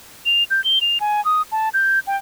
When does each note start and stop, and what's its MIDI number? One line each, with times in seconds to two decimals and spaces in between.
0.26 0.44 101
0.50 0.63 91
0.64 0.79 103
0.81 0.98 101
1.00 1.23 80
1.25 1.42 87
1.52 1.69 81
1.74 2.00 91
2.07 2.17 79